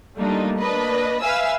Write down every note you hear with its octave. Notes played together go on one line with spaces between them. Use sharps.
G3 A3 A#3 D4 D#4 F4
A#3 D4 B4 D#5
B4 E5 F5 G#5 E6